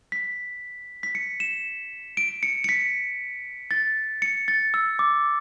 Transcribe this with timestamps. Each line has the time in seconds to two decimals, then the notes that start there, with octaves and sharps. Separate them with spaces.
0.12 B6
1.03 B6
1.15 C#7
1.40 E7
2.17 D7
2.43 C#7
2.64 C#7
2.69 B6
3.71 A6
4.22 C#7
4.48 A6
4.74 E6
4.99 D6